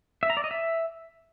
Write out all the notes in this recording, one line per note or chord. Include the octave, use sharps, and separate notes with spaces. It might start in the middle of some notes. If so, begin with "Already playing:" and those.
E5
A#5
D5
D#5
E5